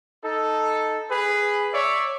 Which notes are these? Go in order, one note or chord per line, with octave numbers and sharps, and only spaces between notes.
D#4 A4
G#4 B4
C#5 D5 E5